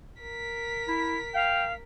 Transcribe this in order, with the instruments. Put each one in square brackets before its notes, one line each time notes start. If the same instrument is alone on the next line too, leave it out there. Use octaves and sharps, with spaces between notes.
[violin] A#4 B6
[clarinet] E4
[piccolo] F5 [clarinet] G5